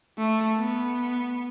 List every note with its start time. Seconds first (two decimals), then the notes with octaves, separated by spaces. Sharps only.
0.19 A3
0.58 B3